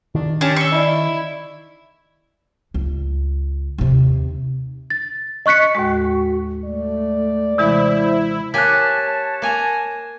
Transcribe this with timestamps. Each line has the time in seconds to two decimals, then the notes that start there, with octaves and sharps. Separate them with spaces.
0.15 D#3 D4
0.41 C#4 D4 G4 A5
0.56 C#6 E6 C7 C#7 G7
0.72 E4 D5 D#5
2.74 C#2
3.78 D#2 C3
4.90 A6
5.46 D#5 C#6 F#6 B6 C#7
5.75 D#2 A2 G#3 F#4
6.64 A3 D5
7.58 C3 E3 G#3 E4 C5
8.54 A#3 G4 C#5 G#5 A5 F#6 B6
9.42 A#3 G#5 A#5